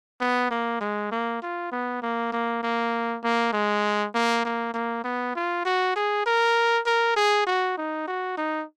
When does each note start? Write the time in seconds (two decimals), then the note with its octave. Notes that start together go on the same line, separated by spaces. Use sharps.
0.21 B3
0.51 A#3
0.81 G#3
1.12 A#3
1.42 F4
1.72 B3
2.02 A#3
2.32 A#3
2.63 A#3
3.23 A#3
3.53 G#3
4.15 A#3
4.45 A#3
4.74 A#3
5.04 B3
5.36 F4
5.65 F#4
5.96 G#4
6.26 A#4
6.86 A#4
7.16 G#4
7.47 F#4
7.78 D#4
8.08 F#4
8.37 D#4